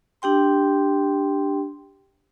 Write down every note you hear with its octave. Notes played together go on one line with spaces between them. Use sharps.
D4 G4 G5 C6